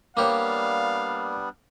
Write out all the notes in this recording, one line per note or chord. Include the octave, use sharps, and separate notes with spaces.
G3 A#3 B3 D4 G4 C#5 F5